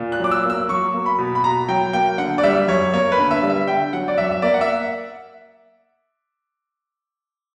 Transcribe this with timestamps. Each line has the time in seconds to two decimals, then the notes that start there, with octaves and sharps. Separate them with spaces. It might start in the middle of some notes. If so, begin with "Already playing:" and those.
Already playing: A#2
0.12 F#6
0.19 F#3 D6
0.31 E6
0.44 A#3
0.50 E6
0.68 F#3 C#6
0.94 A#3
1.06 B5
1.18 B2
1.35 B5
1.44 B2 A#5
1.68 F#3 G5
1.93 A#3 G5
2.18 D3 F#5
2.38 D5
2.43 G3 E5
2.68 F#2 C#5
2.93 A#3 C#5
3.12 B4
3.18 D3
3.31 E5
3.42 G3
3.50 E5
3.67 D3 G5
3.93 F#3 F#5
4.08 D5
4.18 F#2 E5
4.31 E5
4.42 A#3 D5
4.54 F#5
4.61 E5